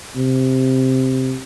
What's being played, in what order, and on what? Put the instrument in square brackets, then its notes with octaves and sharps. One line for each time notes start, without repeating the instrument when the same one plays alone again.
[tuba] C3